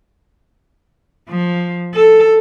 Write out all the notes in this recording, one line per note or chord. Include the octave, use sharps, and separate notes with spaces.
F3
A4